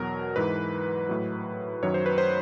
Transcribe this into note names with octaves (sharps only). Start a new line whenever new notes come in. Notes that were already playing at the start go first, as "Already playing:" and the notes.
Already playing: E2 B2 F#3 A#4
G#2 E3 B4
A2 F#3
F#2 D#3 F#3 C#5
C5
B4
C5